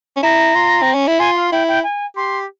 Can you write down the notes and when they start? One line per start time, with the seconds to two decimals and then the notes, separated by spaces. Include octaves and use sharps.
0.16 C#4
0.23 E4 A#5
0.55 F4
0.82 C4
0.95 C#4
1.07 E4
1.19 F4 G#5
1.36 F5
1.52 E4 G5
1.68 G5
1.83 G#5
2.16 G4 C6